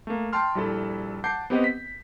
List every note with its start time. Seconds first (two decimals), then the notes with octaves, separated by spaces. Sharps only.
0.07 A3 A#3
0.33 G5 A5 C6 F6
0.55 A#1 G3 E4 A4
1.24 F#5 A5 D6 G6 C7
1.50 B3 C4 G4 B4 D#5 F#5
1.64 B6